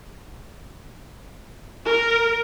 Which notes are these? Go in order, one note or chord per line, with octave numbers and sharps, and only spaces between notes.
A#4